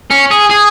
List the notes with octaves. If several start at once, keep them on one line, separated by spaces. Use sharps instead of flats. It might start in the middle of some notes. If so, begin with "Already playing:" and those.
C#4
G#4
G#4